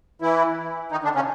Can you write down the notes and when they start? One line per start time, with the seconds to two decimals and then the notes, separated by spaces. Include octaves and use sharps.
0.22 E3 E4
0.92 D#3 D#4
1.04 D3 D4
1.15 C#3 C#4